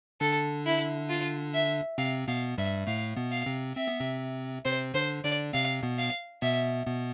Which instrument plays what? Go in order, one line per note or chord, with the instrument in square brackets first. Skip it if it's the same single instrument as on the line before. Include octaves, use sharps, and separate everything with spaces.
[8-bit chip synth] D3 D4 [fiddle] A4
[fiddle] E4
F4
E5
[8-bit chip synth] C3 C4 [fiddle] F5
[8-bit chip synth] B2 B3 [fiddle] F5
[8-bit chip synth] G2 G3 [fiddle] E5
[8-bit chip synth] A2 A3 [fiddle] F5
[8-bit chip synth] B2 B3
[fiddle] F5
[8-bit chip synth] C3 C4
[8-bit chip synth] C4 [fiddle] E5
[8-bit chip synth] B3
C3 C4
[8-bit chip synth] C3 C4 [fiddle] C5
[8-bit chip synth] D3 D4 [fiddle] C5
[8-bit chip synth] D3 D4 [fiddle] D5
[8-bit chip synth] C3 C4 [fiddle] F5
[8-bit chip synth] B2 B3
[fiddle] F5
[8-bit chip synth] B2 B3 [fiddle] E5
[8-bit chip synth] B2 B3